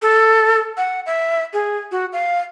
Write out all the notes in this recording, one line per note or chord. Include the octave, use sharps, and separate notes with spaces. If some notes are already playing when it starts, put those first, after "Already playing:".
A4
F#5
E5
G#4
F#4
F5